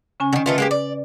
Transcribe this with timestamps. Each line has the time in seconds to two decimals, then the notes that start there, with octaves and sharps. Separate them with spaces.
0.20 C#3 C#4 G#5
0.33 D3 D#3
0.46 D#3 A3 F4 B4
0.58 G#3 A#3 G4
0.71 D5